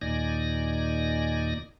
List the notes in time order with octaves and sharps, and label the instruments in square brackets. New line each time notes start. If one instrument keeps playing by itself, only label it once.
[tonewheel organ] D#2 A#2 D#4 D5 G#5 A#6